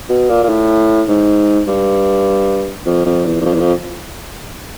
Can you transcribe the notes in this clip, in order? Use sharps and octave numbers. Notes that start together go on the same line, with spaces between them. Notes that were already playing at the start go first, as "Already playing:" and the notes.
B2
A#2
A#2
A2
G#2
G2
F2
F2
E2
E2
F2
E2
F2